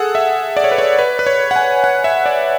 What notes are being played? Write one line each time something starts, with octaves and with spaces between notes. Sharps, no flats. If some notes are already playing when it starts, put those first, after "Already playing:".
Already playing: G#4 A4 F#5
E5
D5
C#5
B4
C#5
B4
B4
C#5
F#5
G#5
F#5
E5
D5